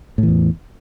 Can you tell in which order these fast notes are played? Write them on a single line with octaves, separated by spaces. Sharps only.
A2 E3 E2